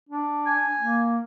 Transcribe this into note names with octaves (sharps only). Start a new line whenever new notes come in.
D4
G#5
A#3